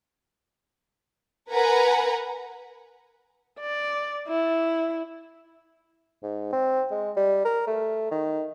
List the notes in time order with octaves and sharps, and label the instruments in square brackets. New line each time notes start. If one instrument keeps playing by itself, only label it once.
[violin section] A#4 B4 F#5 G#5 A#5
[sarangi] D5
E4
[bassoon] G#2
C4
G#3
G3
A#4
A3
D#3